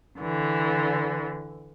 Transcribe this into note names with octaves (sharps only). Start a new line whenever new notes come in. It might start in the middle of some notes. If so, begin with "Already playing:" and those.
D3 E3